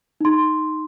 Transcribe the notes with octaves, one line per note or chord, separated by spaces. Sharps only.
D#4 C6